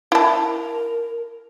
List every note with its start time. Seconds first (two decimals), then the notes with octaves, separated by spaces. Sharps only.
0.12 E4 A#4 A5